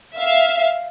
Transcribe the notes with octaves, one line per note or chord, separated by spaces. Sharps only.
E5 F5